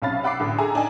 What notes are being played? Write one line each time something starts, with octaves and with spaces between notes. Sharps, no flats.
B1 C3 C#4 F5 B5 A6
E5 F#5 B5 D6 C7
A1 D3
G#4 A4 E5 G#5 A#5
D4 D#4 G#5